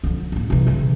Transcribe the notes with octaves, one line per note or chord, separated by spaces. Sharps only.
D3 F3
A1 A#3
C3 E3
C#3 E3